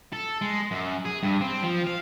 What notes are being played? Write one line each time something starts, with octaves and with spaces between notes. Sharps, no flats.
A4
G#3
F#2
G#4
G2
C4
F3
F5